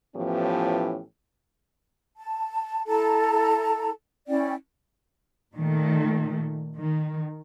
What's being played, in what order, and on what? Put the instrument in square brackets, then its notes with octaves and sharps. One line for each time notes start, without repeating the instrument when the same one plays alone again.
[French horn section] A2 E3 F3 B3 C#4 G4
[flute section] A5
E4 A4 A5 A#5
C#4 E4 D5 G5
[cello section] A#2 D#3 A3
D#3